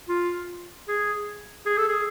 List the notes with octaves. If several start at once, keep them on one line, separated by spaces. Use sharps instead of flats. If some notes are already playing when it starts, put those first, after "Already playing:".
F4
G#4
G#4
A4
G#4